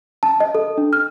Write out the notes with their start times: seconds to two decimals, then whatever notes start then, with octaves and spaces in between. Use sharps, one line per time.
0.23 A5
0.40 D#5
0.55 A4
0.78 D4
0.93 F6